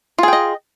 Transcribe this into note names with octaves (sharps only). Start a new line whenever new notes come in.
F4 G#4 D#5 G5